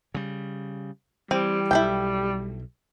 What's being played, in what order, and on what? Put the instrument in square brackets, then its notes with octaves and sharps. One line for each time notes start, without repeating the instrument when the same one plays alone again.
[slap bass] C#3 G3
[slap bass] E3 [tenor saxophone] G3 [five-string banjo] C4
[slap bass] B1 [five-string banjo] E4 A4 G5